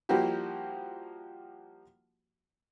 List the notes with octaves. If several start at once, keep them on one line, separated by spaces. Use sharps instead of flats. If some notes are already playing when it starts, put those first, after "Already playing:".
F3 G3 A#3 E4 F#4 G4